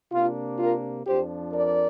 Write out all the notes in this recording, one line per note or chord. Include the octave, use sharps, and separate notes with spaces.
C3 A#3 D4 F4
F4 A#4
F2 F3 D4 G4 C5
A#4 D5